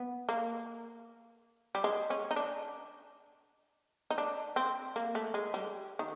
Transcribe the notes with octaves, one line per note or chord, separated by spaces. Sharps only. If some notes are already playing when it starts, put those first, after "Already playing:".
Already playing: B3
A#3
G3
G#3
C#4
D#4
D4
D#4
D4
C4
A#3
A3
G#3
G3
D#3